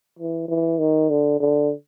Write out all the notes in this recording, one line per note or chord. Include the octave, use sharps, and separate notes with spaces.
E3
E3
D#3
D3
D3